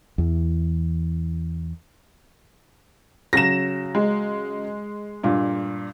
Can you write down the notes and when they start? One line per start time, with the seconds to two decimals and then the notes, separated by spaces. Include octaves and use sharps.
0.18 E2 E3
3.33 C#3 F#3 A#6 E7
3.95 G#3
5.24 G2 A#2